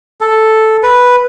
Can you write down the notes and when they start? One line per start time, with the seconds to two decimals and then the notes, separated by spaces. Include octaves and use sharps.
0.21 A4
0.83 B4